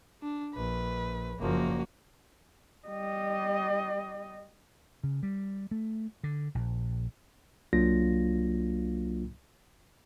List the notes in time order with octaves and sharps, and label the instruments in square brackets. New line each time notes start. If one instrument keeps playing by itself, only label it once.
[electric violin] D4
[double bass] A#1 [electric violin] B4
[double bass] F#1 F3 [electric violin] A#3 F#4
[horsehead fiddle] G3 D#5
[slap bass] C#3
G3
A3
D3
A#1
[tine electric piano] C2 F#3 A#3 D4 F4 A#6